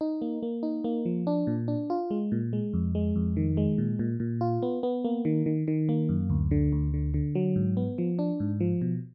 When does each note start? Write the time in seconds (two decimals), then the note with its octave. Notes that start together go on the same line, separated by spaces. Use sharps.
0.01 D#4
0.22 A#3
0.43 A#3
0.63 D#4
0.84 A#3
1.05 F3
1.27 D4
1.47 A#2
1.68 D4
1.90 F4
2.11 G#3
2.32 A#2
2.53 G#3
2.74 F2
2.95 G#3
3.16 F2
3.37 D#3
3.57 G#3
3.78 A#2
3.99 A#2
4.20 A#2
4.41 F4
4.62 B3
4.83 B3
5.04 A#3
5.25 D#3
5.46 D#3
5.68 D#3
5.89 A#3
6.09 F#2
6.30 D2
6.51 D3
6.72 D2
6.94 D3
7.14 D3
7.35 F#3
7.56 G#2
7.77 B3
7.98 F3
8.19 D4
8.40 G#2
8.60 F3
8.82 B2